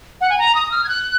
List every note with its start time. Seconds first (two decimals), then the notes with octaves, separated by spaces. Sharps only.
0.21 F#5
0.30 G#5
0.38 A#5
0.55 D#6
0.71 F6
0.84 G#6
0.89 F#6